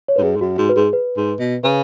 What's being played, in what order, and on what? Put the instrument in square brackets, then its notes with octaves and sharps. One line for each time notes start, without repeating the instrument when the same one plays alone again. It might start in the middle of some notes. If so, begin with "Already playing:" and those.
[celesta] C#5
[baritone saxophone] G#2 [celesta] B4
[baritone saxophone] F#2 [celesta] G#4
[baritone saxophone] G#2
[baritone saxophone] F#2 [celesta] F#4
[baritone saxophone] G#2 [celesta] F#4
[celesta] B4
[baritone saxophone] G#2 [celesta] G#4
[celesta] B4
[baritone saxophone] G#2
B2
[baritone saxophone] C#3 [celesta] B4